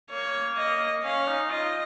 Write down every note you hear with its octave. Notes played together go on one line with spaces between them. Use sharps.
A#3 C#5
D#5
C#4 F5
D#4
F4 D#5